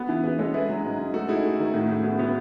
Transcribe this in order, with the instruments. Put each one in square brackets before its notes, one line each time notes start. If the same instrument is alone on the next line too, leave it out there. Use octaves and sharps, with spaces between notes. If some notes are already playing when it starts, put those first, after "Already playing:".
Already playing: [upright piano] B3 [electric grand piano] F#4 A4
[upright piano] E3
[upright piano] E3 [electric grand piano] G#4 B4
[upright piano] G#3 [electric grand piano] A4 C#5
[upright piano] E4 [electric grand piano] G#4 B4
[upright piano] F#3
G#2
G#2
[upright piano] A3 [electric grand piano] F#4 A4
[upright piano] D#4 [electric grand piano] E4 G#4
[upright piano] A3
D#3
[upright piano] A2 [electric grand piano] F#4
[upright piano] A2 [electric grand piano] E4 G#4
[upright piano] B3 [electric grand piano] F#4
[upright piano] B3 [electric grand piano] E4